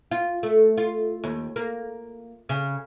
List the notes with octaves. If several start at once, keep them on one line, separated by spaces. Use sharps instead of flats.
F4
A3
F4
D#2
A#3
C#3